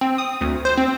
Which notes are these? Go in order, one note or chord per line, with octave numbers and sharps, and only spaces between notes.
C4
D#6
D2
C5
C4